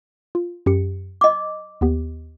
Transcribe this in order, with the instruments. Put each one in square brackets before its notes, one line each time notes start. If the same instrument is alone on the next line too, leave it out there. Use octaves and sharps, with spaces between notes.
[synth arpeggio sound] F4
F#2 G4 C#7
[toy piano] D#5 D6 [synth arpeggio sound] G#6
[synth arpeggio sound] D#2 B3 G4